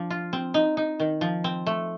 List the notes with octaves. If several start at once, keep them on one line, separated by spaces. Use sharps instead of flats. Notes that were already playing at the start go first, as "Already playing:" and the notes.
Already playing: F3 D4
F4
C4
D#4
D#4
D#3
F3
C4
A3